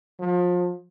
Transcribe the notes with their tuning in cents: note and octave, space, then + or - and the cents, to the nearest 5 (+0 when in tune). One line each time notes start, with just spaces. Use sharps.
F3 +30